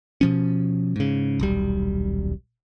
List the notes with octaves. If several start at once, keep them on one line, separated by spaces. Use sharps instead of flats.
B2 F3 C#4
G#2 C#3
D#1 B1 G3